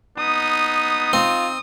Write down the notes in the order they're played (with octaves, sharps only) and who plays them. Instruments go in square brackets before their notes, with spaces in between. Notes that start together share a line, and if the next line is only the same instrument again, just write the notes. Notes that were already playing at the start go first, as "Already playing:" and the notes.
[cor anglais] B3 [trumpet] D#4 [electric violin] D#6
[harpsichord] C4 [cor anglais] F4